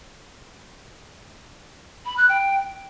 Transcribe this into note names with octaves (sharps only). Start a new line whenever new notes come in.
B5
F#6
G5